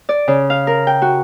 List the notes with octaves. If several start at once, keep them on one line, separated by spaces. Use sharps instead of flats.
D5
C#3
F5
A#4
G5
F#4